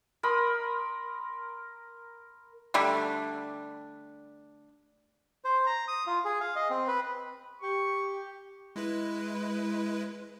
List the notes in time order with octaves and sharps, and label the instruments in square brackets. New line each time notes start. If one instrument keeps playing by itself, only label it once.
[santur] A#4 B5 C6 D#6
[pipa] D3 G3 A3 D4
[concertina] C5
A#5
D#6
F4
G#4
F5
D#5
C4
B4
[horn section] G4 [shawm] C#6
[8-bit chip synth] G#3 E4 B4